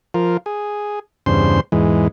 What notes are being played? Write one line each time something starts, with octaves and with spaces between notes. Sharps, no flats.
F3 F4 A#4
G#4
E2 G2 C#3 C5 C6
E2 G#2 E3 G#3